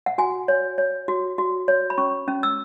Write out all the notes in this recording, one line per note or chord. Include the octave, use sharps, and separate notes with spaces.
F#5
F#4 G#5
C#5
C#5
F#4
F#4
C#5
B5
C#4 C#6
C#4
E6